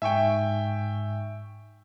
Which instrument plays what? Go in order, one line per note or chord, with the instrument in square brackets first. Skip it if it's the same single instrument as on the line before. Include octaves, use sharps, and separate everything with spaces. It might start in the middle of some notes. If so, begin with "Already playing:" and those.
[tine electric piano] G#2 G#5 C#6 [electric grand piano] E5 G5